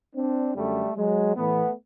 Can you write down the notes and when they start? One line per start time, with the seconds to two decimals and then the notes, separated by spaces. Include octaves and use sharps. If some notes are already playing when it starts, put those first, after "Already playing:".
0.15 C4 D4
0.55 F#2 D3 G3 A3
0.96 F#3 G#3
1.36 A2 E3 A3 B3